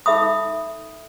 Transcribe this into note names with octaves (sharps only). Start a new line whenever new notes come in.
D#4 A4 E5 B5 D#6